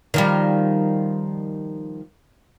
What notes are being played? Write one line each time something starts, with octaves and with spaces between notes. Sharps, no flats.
D#3 F3 G3